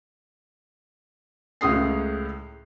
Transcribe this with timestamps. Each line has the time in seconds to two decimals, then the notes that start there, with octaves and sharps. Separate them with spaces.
1.61 C#2 A2 G#3 D#6 C7